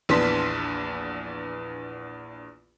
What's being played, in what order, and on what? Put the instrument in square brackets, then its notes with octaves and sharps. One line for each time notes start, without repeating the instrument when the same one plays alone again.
[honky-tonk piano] A#1 E2 B3 D4 C6 B6